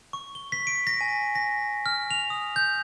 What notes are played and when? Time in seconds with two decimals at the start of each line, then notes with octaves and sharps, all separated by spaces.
0.13 C#6
0.35 G7
0.52 B6
0.67 D7
0.87 A#6
1.01 G#5
1.35 A#6
1.86 F6
2.11 F7
2.30 D#6
2.56 G6